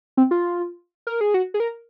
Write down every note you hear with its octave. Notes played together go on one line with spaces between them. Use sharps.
C4
F4
A#4
G#4
F#4
G#4
A#4